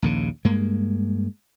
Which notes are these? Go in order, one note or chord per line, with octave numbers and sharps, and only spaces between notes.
A#1 D#2 C#3
G2 G#3 A#3